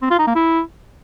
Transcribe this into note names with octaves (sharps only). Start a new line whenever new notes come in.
C4
F4
D#4
A#3
E4